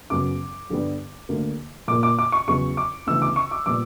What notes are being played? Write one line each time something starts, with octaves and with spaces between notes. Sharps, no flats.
F#2 C#3 F#3 B3 D6
G2 D3 G3 B3
D2 D3 A#3
A#2 A#3 D6
D6
D6
C#6
E2 C#3 F#3 B3 C#6
D6
D2 C#3 E3 B3 E6
D6
C#6
D6
A#2 G3 B3 D6